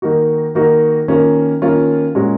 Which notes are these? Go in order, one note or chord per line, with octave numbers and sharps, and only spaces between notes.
D#3 A#3 D#4 F#4
D#3 A#3 D#4 F#4
D#3 A#3 C#4 F4
D#3 A#3 C#4 F4
A#2 G#3 C#4 F#4